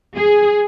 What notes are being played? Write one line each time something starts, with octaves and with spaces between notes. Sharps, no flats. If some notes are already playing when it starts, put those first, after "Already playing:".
G#4